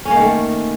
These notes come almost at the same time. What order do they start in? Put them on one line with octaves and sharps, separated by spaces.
C#4 A#3 D#3 A3